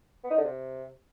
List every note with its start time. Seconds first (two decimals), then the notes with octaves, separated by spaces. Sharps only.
0.24 B3
0.31 D#4
0.37 D3
0.44 C3